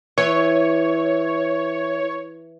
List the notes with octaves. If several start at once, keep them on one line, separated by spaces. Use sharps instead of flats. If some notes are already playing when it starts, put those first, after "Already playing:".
E3 C#5